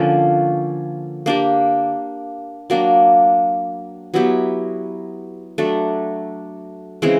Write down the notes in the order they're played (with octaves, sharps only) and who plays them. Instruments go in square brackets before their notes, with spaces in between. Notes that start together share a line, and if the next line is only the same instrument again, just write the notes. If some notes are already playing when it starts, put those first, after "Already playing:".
Already playing: [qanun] D3 F3 A#3 C#4
A#3 D4 G4
F#3 A#3 D4
F#3 B3 E4 G4
F#3 A3 D4
C#3 E3 G#3 C4